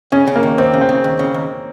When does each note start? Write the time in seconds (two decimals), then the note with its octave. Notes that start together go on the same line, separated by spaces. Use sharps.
0.12 C#3 C#4
0.27 C#3
0.36 A#3
0.43 D#2
0.58 D#2 C4
0.73 C#3
0.81 C4
0.89 C#3
1.04 D#2
1.19 C#3
1.34 D#2